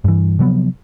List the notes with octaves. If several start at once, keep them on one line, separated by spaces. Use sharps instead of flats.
G2 E3
C3 F3 F#3 B3